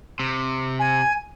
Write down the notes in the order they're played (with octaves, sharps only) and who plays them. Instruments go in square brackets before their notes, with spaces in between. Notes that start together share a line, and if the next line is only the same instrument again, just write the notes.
[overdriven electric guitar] C3
[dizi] G#5